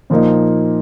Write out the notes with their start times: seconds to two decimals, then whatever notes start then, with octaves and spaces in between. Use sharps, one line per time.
0.10 A#2 F3 A#3 D#4